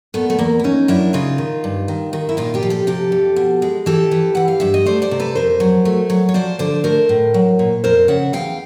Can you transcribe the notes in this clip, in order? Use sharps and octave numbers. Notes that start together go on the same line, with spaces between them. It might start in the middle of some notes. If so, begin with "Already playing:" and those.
A#2 A3 B3
A3
E2 A#3
E4
E2 C#4 D#4
F#2 D4 E4
C#3 D#4 F4
D#3
G2
D#3
D#3
E4
A#2 D#4 F4
F4 G4
F3
G4 A4
C3 G4 A4
F2
B2
G#3
E3 G4 A4
E3
E3 F#5
F5
G2 E5
D#5
A3 C5 D5
C5 D5
C3
A4 B4
F2 A#4 C5
F#3
A3
F#3
C#5
F3 C5 D5
D3 C5 D5
A3 A#4 C5
A2
F#3
A#2
F2 A#4 C5
C#3 E5 F#5
E2 F5 G5